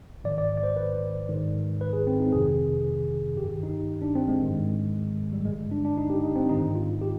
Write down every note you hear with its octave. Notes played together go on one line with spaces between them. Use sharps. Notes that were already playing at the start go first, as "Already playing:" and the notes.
G#2 D#3 D5
D5
D5
C5
B4
G#2 D#3
B4
G#4
C4
D#4
F2 C3 D#3 G#4
G2 D#3 G4
D#4
D4
C4
G#3
G#2 D#3
G3
G2 D3 G#3
D4
D4
D#4
G4
D#4
C4
G#2 D#3 D#4
F4
G4